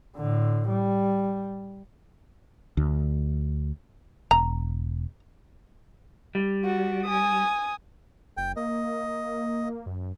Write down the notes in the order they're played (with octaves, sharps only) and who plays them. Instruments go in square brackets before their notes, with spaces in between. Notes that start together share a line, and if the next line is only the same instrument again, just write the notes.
[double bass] A2 D3
G3
[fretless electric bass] D2
[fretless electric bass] E1 [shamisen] A#5
[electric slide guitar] G3
[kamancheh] F#4
G#5 D#6
[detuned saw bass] F#1 [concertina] G5
[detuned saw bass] A#3 [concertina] D#5
[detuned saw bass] F#2